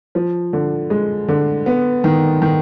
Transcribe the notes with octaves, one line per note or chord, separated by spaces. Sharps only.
F3
D3
G#3
D3
B3
D#3
D#3